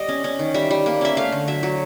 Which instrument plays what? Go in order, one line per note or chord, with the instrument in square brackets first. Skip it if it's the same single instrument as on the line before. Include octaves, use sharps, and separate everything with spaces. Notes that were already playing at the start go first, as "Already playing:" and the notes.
Already playing: [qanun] G3 D#5
C#4
C#4
D#3
G3 E5
G3
A#3
C#4 E5
A3 F5
D3
F#3 E5
F#3